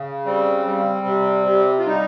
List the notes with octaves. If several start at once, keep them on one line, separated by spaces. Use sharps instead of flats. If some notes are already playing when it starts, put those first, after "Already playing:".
Already playing: C#3
G3 C4
G3
C3
C3
F4
G3 D#4